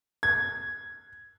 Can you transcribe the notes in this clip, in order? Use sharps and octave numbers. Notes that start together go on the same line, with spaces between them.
G#6